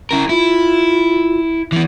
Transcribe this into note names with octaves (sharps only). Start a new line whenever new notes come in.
C#4 E4 A#4
E4 F4
E3 B3